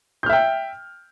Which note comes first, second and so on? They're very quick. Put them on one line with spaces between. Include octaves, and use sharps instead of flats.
G6 F6 E5 G5